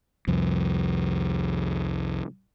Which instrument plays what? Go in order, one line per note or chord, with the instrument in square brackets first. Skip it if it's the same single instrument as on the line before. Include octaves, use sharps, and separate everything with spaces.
[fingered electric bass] C2 F2